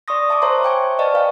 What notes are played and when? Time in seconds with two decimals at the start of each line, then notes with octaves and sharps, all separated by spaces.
0.08 D5 C6 C#6 D#6 A#6
0.29 E5 A5 C#6 D6
0.42 C5 C#5 E5 A5 A#5 C6
0.63 C5 G5 G#5 C#6
0.99 B4 D5 D#5 F5 A5 C#6
1.14 B4 F5 G5